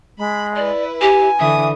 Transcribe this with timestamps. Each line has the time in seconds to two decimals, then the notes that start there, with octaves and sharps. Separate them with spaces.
0.18 G#3 B5
0.56 E4 B4 D5
1.01 G4 G#5
1.40 D3 E3 E5 D#6